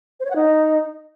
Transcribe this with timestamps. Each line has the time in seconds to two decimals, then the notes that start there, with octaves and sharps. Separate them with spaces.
0.20 C5
0.25 C#5
0.30 F#5
0.36 D#4